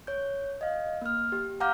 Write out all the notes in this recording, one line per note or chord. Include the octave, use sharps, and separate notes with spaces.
C#5 G6
D#5 F5
A#3 F6
G4
F5 F#5 A#5 D6 F6 G6